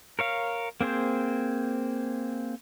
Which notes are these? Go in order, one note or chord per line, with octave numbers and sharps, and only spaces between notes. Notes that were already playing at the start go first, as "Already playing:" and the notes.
A#4 C#5 F5
A#3 C4 G#4 C5